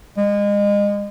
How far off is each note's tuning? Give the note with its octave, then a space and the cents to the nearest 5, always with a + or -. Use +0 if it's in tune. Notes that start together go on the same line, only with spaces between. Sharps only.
G#3 -30